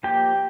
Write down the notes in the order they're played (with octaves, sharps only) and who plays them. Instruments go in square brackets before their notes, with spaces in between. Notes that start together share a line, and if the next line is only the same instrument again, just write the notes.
[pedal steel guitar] F3 A#3 G4 G5